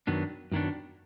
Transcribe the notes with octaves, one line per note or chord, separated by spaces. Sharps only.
F#2 D#3 F#3 B3 D4
F#2 D#3 F#3 B3 D4